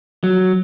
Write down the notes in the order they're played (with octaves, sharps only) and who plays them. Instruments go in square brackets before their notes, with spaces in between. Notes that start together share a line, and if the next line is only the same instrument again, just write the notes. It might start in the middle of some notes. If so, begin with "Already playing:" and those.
[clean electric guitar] F#3